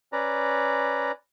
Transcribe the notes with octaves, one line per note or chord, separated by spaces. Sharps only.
C#4 B4 D5 A#5